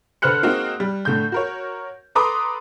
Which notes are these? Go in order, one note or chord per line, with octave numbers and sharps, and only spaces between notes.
D3 B4 C5 F6 F#6 C#7
G#3 A#3 C4 D#4 F#4
G3
A2 D3 G6
F#4 A#4 C#5
A4 B4 A#5 C6 D6 D#6